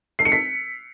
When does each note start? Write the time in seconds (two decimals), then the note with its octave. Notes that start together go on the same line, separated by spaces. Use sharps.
0.19 C7
0.25 C#7
0.32 B6